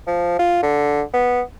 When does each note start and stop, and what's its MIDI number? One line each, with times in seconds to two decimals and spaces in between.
0.07 0.35 53
0.39 0.60 65
0.62 1.02 50
1.14 1.41 59